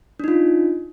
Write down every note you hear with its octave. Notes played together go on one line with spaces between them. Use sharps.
D4 D#4 F4